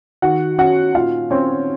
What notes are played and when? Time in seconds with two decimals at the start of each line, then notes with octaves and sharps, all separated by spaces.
0.22 D#3 F#4 F#5
0.58 C#4 F#4 F#5
0.95 A#2 F4 F5
1.30 C4 C#4 C#5